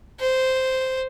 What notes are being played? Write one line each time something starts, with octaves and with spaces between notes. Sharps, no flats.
C5